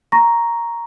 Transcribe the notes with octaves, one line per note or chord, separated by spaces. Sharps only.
A#5 C#6 A#6